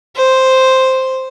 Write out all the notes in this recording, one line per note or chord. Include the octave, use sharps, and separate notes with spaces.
C5